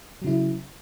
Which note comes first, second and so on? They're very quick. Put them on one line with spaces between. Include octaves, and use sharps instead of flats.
F#3 C#3 E4